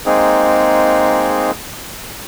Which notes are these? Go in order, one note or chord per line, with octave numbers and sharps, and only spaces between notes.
G#3 A#3 C4 D#4 G#4